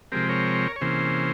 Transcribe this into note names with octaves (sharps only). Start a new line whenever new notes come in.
C3 F3 G#3 C4 G4 A#4
A#4 C#5
C#5
C3 E3 A#3 C#4 G#4 C5